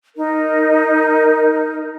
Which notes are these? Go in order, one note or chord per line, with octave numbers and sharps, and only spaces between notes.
D#4 A#4